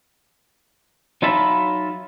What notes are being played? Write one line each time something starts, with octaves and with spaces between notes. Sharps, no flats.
F#3 D#4 F4 E5 A5 B5